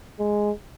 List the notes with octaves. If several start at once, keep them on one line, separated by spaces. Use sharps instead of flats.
G#3